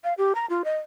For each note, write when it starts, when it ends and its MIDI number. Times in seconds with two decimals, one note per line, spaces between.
0.04 0.13 77
0.18 0.33 67
0.35 0.46 82
0.50 0.62 65
0.64 0.77 75